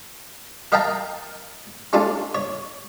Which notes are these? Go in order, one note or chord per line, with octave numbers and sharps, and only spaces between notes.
A#4 D#5 F5 G5 A5 A#5
G#3 C#4 D4 F4 A4
C#5